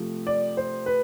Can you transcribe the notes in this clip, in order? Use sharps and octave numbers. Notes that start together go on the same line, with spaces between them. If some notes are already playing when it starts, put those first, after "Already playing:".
Already playing: C3 F3 A3
D5
C5
B4